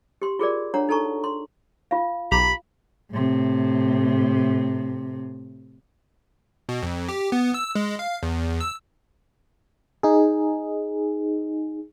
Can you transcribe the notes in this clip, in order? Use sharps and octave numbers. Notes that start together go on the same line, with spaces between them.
G4 C6
F4 G#4 A#4 D5
D4 C#5 F#5 A#5
D#4 A4 A5 A#5 C#6
C6
F4 F5
B1 G4 A#5 B5
A2 C3
B2
F2
G4
B3
E6
G#3
F5
E2
E6
D#4 G#4